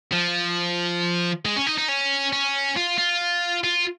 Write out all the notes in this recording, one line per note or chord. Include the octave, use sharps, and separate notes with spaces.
F3
G#3
C#4
D#4
D#4
C#4
C#4
F4
F4
F4